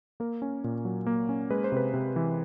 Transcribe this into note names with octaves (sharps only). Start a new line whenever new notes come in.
A#3 A#4
C#4
A#2
F#3
A#3
C#4
G#3 B4
C5
C3 B4
C3
E3